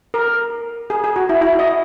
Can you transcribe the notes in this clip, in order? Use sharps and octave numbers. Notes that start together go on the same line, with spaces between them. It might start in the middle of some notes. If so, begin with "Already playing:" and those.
A#4
G#4
G#4
F#4
E4
E4
D#5